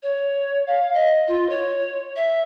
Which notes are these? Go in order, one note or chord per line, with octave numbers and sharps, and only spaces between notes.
C#5
F5
D#5
F4
C#5
E5